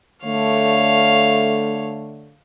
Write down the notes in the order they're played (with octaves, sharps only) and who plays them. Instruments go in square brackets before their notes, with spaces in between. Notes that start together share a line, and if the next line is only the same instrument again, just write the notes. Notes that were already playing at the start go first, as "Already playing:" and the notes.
[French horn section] D3 A3 [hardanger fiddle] C#5 F5